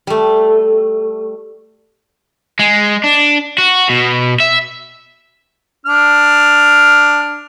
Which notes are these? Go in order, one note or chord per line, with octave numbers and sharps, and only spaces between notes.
G3 A3
G#3
D4
F#4
B2
E5
D4 F6